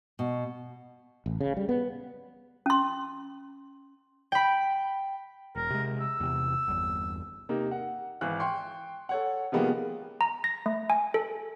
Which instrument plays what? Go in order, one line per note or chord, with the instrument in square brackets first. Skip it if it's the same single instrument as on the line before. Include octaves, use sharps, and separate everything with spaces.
[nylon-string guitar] B2
[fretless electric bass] A1
C#3
G3
B3
[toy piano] C#4 C6
[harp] G5 B5
[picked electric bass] E1 [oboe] A#4
[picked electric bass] C3 G#3
[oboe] E6
[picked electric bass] E2 C3
G1 E2
[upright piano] C3 A#3 D#4
F#5
G#1 E3 F#6
G5 C6 C#6
A4 C#5 F#5
C3 D#3 F3 G#3 A#3 B3
[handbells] A#5
A#6
A3
G#5
A4